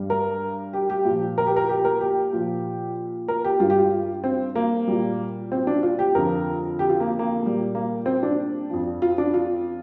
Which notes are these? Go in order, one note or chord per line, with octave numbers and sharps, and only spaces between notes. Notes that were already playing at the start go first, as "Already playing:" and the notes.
Already playing: G2 G3
A#4
G4
G4
A#2 F3
A#4
G4
A#4
G4
A#4
G4
A#2 F3
A#4
G4
G2 G3 F4
G4
F4
C4
A#3
A#2 G3
C4
D4
F4
G4
F2 D3 F3 A#4
G4
F4
A#3
A#3
A#2 G3
A#3
C4
D4
F2 F3
F4
D4
F4